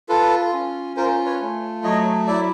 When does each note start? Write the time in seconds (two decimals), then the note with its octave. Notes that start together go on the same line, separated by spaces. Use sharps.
0.09 F4 A4 B4
0.53 C#4
0.96 F4 A#4 C5
1.26 B4 C#5
1.40 A3
1.83 F#3 C#5 D#5
2.27 E4 D5 E5